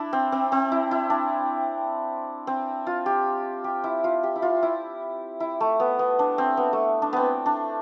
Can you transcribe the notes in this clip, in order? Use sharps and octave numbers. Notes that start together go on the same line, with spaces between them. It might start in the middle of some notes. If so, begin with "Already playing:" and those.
Already playing: D4 E4
C4
C4
C4
E4
E4
D4
C4
F4
G4
G4
E4
F4
G4
E4
F4
E4
E4
A3
B3
B3
D4
C4
B3
A3
D4
B3 C4
D4